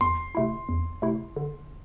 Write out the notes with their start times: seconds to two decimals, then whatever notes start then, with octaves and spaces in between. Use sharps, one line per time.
0.01 E2 C6
0.35 C3 A3 E4
0.69 E2
1.02 C3 A3 E4
1.36 D3